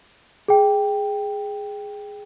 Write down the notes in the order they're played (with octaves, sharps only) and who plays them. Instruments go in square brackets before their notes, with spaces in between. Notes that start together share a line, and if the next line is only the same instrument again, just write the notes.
[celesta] G#4 G5